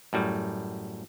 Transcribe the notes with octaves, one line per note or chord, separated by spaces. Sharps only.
F#2 A2 G3